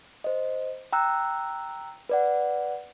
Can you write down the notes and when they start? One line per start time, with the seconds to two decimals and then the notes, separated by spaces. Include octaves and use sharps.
0.24 C5 D#5
0.93 G5 A#5 E6 F#6
2.09 B4 D5 F#5